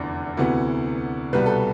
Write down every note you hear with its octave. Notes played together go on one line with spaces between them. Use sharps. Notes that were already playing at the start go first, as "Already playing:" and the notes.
Already playing: F1 E2 D3 D5
D2 C3 E3 B3
C2 B2 G3 B3 B4
A4